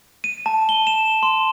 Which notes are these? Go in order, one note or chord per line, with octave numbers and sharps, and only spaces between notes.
D#7
A5
G7
E7
C6